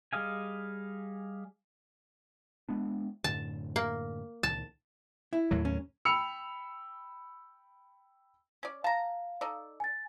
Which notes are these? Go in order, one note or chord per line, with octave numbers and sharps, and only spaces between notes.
G3 G#4 D#5 F5 G#5
G#3 B3 D4
F#2 A2 D3 A5
A#3
C#2 A#2 D#3 A5
E4
D#2 A2 F#3
C#4
G5 B5 E6 C#7 F7
C#4 D5
F5 A5 A#5
D#4 A4 D5
G#5 A6